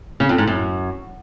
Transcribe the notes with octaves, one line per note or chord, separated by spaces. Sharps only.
C#3
F2
G#2
F#2